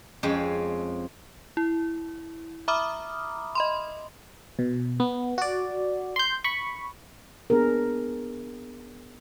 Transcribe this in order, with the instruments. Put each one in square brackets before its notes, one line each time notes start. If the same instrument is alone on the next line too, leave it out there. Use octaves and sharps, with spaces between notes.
[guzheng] F2 G#3 C4 C#4
[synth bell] E4
E5 A#5 B5 D6 D#6 F6
D#5 B5 C6
[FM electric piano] B2
B3
F#4 D5
C6 G6
B5 C#6
[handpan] B3 D4 G#4 A#4